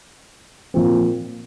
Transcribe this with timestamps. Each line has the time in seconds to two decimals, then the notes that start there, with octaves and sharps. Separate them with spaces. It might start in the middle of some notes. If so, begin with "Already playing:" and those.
0.74 A#2 F3 C4